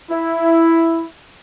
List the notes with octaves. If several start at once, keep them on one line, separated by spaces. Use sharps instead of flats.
E4